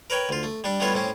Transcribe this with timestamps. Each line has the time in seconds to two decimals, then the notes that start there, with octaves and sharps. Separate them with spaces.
0.10 A#4 B4 C#5 G5
0.29 D2 F4
0.43 A3
0.64 G3 D4
0.80 G3 A3 B3 E4 F4 C#5
0.94 A2 C4 C#4